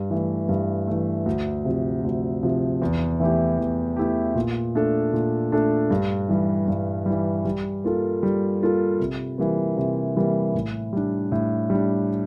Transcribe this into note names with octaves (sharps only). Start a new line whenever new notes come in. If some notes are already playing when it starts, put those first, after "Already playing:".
Already playing: G2
E3 A3
G2
E3 A3
D2
C3 F3
D2
C3 F3
E2
E3 A3 E4 G4
E2
E3 A3 E4 G4
A#2
A3 D4 A4
A#2
A3 D4 A4
G2
E3 G3
G2
E3 G3
G3
A#3 F4 A4
G3
A#3 F4 A4
C3
E3 G3 A#3
C3
E3 G3 A#3
A2
G3 D4
A2
G3 D4